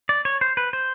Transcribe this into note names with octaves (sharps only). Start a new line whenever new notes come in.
D5
C#5
C5
B4
C5